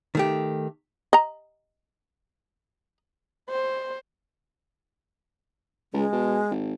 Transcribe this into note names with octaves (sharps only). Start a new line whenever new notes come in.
D#3 A3 G4
D#5 A#5
C5
C#2 G#3
B2
G#1